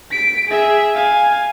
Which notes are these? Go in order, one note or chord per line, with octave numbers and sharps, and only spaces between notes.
B6 D7
G#4 E5
F5 G#5